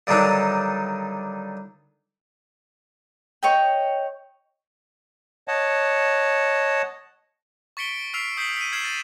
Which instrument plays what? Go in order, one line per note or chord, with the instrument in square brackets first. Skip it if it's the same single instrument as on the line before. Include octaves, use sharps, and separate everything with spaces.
[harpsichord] G2 D3 D#3 F#3 D4 D#4
[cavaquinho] C#5 D#5 G5
[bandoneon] C#5 D#5 F#5 A5
[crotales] C#6 A6 B6 C#7 D7 G7
E6 F6 B6 C7 D7 F7
D#6 G6 B6 C7 D7 F#7
B6 D#7
F6 G#6 C7 E7 F#7
A6